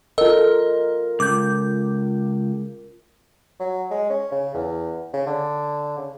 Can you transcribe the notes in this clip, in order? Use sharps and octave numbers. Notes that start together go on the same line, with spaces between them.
F4 A4 A#4 D#5
C#2 D6 G6
F#3
G#3
C#4
C#3
E2
C#3
D3
C#3